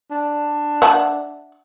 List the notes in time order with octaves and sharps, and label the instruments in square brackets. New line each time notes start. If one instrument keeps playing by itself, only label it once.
[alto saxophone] D4
[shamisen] E5 F#5 A5